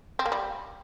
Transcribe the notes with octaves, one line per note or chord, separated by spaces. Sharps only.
C4
A#3
G3